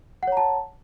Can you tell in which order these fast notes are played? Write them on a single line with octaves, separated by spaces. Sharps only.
F#5 C#5 A#5 A5